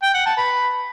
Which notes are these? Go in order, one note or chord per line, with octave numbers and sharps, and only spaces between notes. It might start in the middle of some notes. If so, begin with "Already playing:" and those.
G5
F#5
A5
B4